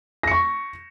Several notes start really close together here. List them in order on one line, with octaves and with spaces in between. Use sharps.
A#6 C#7 C#6